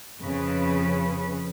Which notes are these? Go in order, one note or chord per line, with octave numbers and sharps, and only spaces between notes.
F2 C#3 B4